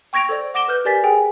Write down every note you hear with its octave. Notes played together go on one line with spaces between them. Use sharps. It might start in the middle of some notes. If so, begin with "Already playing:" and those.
G5 C#6 G#6 A#6 D7 F7
A4 C5 D5
F#5 D6 A#6 D7 E7 G7
B4 F6 G6
G4 A#4 D5 G#5 A6 B6
G#4 G5 G#5